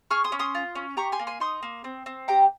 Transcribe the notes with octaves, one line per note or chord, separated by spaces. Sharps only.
G#4 C#6 F6
C6 D#6
C#4
C6 D#6
F4
C#4
G4 A#5 C#6
G#5 C6
A#3
G#5 C6
D#4 C6 D#6
A#3
C4
C4
G4 G5 A#5